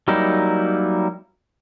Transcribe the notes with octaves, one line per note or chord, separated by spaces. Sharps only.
F#3 G3 A#3 D#4 E4